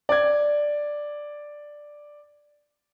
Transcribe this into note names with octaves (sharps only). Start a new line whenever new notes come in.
D5 G#6